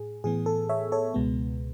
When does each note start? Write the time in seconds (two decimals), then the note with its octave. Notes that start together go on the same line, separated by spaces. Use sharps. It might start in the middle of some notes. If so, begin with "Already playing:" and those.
Already playing: A2 G#4
0.24 A2 E3 B3 G#4
0.46 A4
0.69 C#5 E5
0.92 A4 C#5
1.14 C#2 B2 G#3 B3